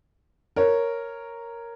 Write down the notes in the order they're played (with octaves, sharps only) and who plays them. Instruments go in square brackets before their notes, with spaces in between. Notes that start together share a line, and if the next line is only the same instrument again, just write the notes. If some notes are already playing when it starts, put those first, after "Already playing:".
[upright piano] A#4 C#5